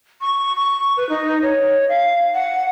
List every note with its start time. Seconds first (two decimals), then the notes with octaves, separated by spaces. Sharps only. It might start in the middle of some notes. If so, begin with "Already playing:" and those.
0.21 C#6
0.56 C#6
0.97 B4
1.09 D#4
1.42 C#5
1.89 F5
2.35 F#5